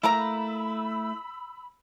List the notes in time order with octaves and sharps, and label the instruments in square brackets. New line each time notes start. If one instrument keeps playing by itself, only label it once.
[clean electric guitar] A3 E4 [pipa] A#3 A#4 A#5 [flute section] B5 E6